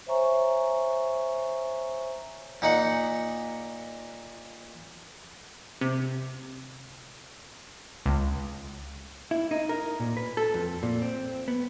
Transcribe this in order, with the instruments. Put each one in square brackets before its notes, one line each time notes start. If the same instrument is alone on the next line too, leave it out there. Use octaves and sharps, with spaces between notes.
[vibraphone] C5 C#5 E5 G#5 A#5 C#6
[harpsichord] A#2 D#4 F#5
[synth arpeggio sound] C3
C#2
[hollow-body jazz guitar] E4
D#4
A#4
A#2
B4
A4
F2
A#2
C4
B3